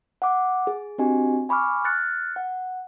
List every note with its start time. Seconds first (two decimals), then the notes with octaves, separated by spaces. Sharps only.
0.22 F#5 D6
0.67 G#4
0.98 C4 D4 F#4 G4 D#5 G#5
1.49 G#5 B5 C#6 D6 F6
1.84 F6 F#6 A6 C#7
2.36 F#5